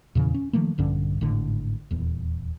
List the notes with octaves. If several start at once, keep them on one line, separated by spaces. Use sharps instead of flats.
E2 A#2 C#3 E3
C#4
D#3 F3 A3 A#3
A#1 G2 D3 C#4
G#1 A2 D3
D#1 E2